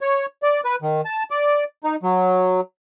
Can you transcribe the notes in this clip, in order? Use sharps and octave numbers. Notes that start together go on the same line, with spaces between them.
C#5
D5
B4
D#3
A5
D5
D#4
F#3